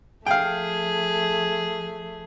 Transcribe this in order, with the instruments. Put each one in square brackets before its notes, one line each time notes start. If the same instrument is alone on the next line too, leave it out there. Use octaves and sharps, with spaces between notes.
[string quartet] F3 A3 [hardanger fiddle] G#4 [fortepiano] F5 G5